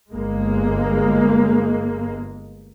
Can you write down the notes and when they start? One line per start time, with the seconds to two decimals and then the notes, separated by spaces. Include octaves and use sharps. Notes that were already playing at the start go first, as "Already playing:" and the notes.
0.11 G1 G#3 A#3